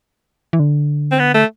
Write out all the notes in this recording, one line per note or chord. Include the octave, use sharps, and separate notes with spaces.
E3
D3
C4
B3
A3